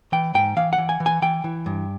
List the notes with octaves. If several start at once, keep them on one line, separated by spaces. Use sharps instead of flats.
E3 G5
G#2 G5
E3 F5
F#5
E3
G#5
E3
G#5
E3 G5
E3
G2